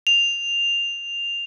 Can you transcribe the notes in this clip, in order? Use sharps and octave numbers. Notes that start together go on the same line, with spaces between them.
F7